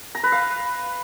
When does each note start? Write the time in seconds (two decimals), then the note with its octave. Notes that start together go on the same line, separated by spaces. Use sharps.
0.15 A#5
0.23 B4
0.32 F5